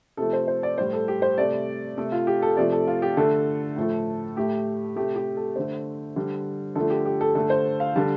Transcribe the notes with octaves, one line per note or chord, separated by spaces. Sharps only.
C3 F3 A3 A4
C5
C5
D5
A2 G3 C5
A4
G4
C5
C3 A3 D5
C3 A3 A4
F4
G4
A4
C3 F3 A3 D5
A4
F4
G4
D3 A3 A4
A2 F3 A3
A2 A3 G4
C3 A3 G4
G4
A4
D3 A3 C5
D3 G3
D3 F3 A3 A4
G4
G4
A4
D3 A3 A4
C5
F5
D3 G3 A5